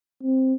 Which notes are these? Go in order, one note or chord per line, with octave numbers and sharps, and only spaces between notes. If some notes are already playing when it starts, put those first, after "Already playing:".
C4